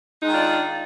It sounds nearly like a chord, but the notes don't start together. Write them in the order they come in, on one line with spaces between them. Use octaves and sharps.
D#4 G#3 D#3 F4 D4